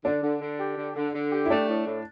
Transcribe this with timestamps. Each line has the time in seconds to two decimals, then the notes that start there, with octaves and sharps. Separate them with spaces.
0.05 D3 D4
0.23 D3
0.41 D3
0.59 G4
0.77 D3
0.96 D3
1.14 D3
1.32 G4
1.46 E4
1.50 A3 D4
1.68 A2
1.86 A2